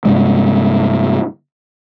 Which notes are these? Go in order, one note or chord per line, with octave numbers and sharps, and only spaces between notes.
G2 C3 G#3